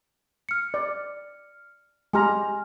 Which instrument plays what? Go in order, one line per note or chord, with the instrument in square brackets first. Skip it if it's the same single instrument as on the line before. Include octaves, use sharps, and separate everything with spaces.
[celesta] F6 C#7
[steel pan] D5
[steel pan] G#3 G4 A#5 [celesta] G#5 C6 F6